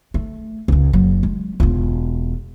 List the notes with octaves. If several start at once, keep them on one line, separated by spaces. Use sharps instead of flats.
A3
C#2 C#3
F#1 F#3
G#3
E1 F4